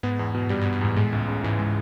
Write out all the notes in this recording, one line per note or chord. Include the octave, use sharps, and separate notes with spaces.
G#2 B3
E2
B2
G2 G3
G2
B3
G2
E2 G#2
A2 G#3
C#2
C#3
G#2 E3
G#3